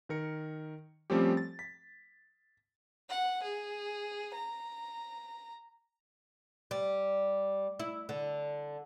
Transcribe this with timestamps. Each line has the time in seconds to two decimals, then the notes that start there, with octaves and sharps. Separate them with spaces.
0.09 D#3 A#4 C#7
1.10 F3 G3 A3 C4 C#4 G4
1.37 A6
1.59 B6
3.09 F#5
3.43 G#4
4.35 A#5
6.71 G3
7.79 E4
8.09 D3